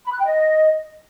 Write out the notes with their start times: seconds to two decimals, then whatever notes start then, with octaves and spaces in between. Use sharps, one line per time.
0.05 B5
0.12 F#6
0.19 G5
0.26 D#5